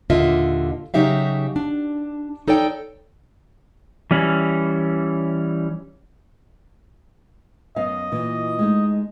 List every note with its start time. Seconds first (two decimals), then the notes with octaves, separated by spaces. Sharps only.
0.10 D#2 A#2 D3 F4 D#5 E5
0.94 C#3 F#3 D#4 G4 E5 F5
1.56 D4
2.48 D#4 A4 C#5 D5 G5
4.11 E3 G3 C#4
7.76 F#2 B3 D#5 F5
8.12 A#2 E3
8.59 G#3 A3 D#4